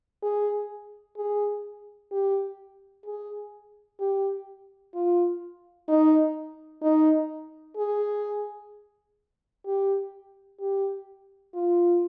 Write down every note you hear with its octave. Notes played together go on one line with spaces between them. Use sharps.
G#4
G#4
G4
G#4
G4
F4
D#4
D#4
G#4
G4
G4
F4